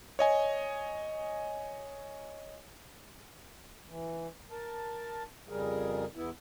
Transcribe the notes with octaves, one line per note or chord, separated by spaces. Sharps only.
C#5 D#5 G#5
E3
A#4 A5
F2 C#3 G3 G#4 A#4
E2 B3 E4